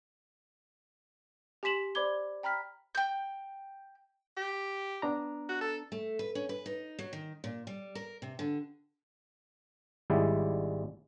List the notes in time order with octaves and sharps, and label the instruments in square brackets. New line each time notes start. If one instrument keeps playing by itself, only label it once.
[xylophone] G4 G#5 C6 B6 E7 F#7
C5 D5 B5 D6 G#6 G7
G5 A#5 B5 F6 B6
[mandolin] G5 G6
[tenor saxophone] G4
[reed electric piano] B3 D4 A#5
[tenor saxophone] F#4
A4
[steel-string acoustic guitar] A3
B4
C#4
B4
D#4
F#3
D#3
A#2
G3
A#4
C3
D3
[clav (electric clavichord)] G#1 G3 G#3 E4 G4 D5